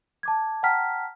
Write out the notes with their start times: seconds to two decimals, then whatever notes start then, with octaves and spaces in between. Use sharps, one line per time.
0.23 A5 D6 G#6
0.63 F#5 G5 A5 A#5 F6 B6